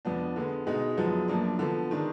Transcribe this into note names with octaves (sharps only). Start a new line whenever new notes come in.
F2 F3 B3 D4
D3 G#3 B3
B2 G#3 D#4
F#2 F3 G#3 B3
F#2 F3 A#3 D4
D3 F3 B3
D#3 G#3 D4